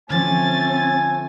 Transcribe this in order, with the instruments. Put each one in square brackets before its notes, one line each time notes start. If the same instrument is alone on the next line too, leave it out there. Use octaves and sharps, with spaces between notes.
[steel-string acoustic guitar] D3 F3 [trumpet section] A3 G#5 [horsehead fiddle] C4 C#4 [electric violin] A6